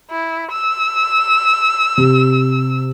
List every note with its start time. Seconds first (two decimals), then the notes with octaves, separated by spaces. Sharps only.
0.11 E4
0.52 E6
1.97 C3